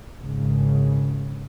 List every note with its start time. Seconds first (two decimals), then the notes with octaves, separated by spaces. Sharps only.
0.19 G#1 C#3